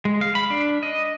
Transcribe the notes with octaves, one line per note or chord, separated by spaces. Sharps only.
G#3
F5
B5
D4
D#5